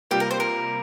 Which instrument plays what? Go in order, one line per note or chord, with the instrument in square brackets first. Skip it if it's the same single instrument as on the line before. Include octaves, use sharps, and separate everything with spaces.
[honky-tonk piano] C3 G3 A#3 F4 [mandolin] G4
[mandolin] A#4
C5
A#4